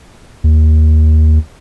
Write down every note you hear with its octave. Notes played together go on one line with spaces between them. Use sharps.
D#2